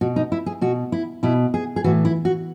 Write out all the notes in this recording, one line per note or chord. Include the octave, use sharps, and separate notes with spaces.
B2 F#4
D#4
E4
G#4
B2 F#4
E4
B2 E4
G#4
G#4
A2 E3 F#4
E4
F#4